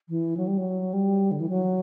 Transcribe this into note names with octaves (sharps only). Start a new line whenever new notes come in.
E3
F#3
G3
F#3
G3
D3
E3
F#3